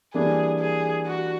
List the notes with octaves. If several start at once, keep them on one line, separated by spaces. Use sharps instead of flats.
E3 G3 A#3 D4 G#4
G#4
F#4